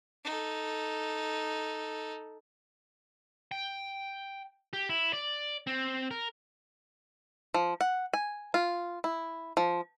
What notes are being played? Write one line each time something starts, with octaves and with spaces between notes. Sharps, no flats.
D#4 A4
G5
G4
E4
D5
C4
A#4
F3
F#5
G#5
F4
E4
F3